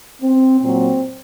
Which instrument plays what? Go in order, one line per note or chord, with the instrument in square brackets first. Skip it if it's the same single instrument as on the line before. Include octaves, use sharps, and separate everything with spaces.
[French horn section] C4
A#2 F#3 C4